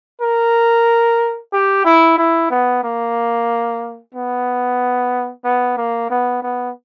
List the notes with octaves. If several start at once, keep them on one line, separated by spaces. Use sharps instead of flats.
A#4
G4
E4
E4
B3
A#3
B3
B3
A#3
B3
B3